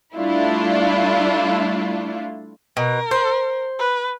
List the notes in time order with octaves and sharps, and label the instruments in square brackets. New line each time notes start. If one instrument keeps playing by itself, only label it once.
[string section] G3 A3 D4 E4 F4
[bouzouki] B2 [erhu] A#4
[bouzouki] C5
[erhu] B4